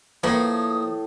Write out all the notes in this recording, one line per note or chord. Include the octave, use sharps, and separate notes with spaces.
A2 F3 A#3 B4 D#6